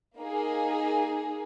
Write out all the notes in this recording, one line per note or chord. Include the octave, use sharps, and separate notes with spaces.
A#3 D#4 G#4